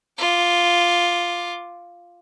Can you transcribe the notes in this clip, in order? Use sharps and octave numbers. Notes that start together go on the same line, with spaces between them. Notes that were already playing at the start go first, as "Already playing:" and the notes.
F4 D6